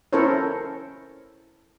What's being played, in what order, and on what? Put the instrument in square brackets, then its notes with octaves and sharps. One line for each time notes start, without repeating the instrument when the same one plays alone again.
[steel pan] C#4 E4 A4 A#4 C5 C#5